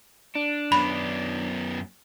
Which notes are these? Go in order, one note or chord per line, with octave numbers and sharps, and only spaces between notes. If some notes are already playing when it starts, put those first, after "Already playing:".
D4
F#2 B3 B5